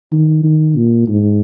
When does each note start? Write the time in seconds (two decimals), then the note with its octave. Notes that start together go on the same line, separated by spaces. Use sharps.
0.12 D#3
0.44 D#3
0.76 A#2
1.08 G#2